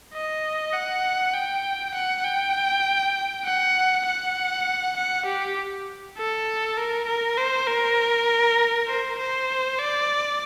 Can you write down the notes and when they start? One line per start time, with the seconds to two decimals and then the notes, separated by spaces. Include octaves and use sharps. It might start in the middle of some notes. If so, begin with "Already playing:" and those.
0.14 D#5
0.73 F#5
1.34 G5
1.95 F#5
2.25 G5
3.45 F#5
4.06 F#5
4.96 F#5
5.26 G4
6.17 A4
6.77 A#4
7.07 A#4
7.37 C5
7.67 A#4
8.88 C5
9.19 C5
9.79 D5